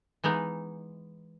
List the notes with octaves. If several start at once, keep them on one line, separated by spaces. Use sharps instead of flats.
E3 G#3 B3 D#4